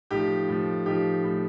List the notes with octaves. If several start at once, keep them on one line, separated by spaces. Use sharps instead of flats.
A2 F3 D#4 G4
A2 F3
A2 F3 D#4 G4
A2 F3